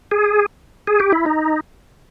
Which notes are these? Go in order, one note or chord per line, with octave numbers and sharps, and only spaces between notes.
G#4
G#4
G4
E4
D#4